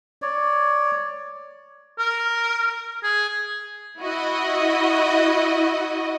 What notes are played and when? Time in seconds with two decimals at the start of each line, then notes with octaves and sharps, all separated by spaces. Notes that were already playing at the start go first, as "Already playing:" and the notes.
0.22 C#5 D5
1.99 A#4
3.03 G#4
4.00 E4 F#4 D#5